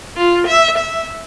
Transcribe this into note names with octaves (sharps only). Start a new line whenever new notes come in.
F4
E5
E5